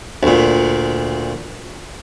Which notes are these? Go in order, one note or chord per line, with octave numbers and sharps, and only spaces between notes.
D2 A#2